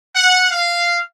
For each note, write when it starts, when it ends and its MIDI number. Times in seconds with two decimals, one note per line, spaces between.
0.14 0.47 78
0.51 0.98 77